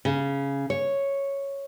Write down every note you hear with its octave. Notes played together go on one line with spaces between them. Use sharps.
C#3
C#5